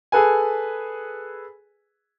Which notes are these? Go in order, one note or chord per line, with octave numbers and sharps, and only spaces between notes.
G#4 A4 B4 G#5